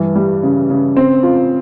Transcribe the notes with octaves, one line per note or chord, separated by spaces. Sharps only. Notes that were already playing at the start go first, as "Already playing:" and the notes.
Already playing: G2 E3
G3
C#3
C#3
C4
F4